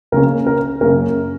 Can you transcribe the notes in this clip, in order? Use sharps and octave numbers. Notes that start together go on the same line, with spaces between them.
C#2 C#3 A#3 C#4 A#4
A#4
F#2 C#3 A#3 C#4 A#4